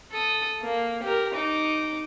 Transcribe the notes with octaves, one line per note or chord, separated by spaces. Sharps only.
A4 D#6
A#3
G4 A#4
D#4 D6